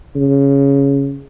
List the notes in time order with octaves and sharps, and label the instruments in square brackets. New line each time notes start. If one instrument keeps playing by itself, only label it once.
[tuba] C#3